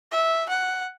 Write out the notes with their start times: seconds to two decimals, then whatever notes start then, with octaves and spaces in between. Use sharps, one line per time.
0.12 E5
0.49 F#5